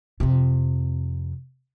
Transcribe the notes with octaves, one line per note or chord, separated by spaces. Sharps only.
F2 C3